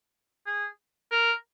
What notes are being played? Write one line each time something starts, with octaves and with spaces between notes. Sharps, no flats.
G#4
A#4